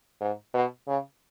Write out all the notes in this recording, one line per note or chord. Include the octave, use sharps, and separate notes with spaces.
G#2
B2
C#3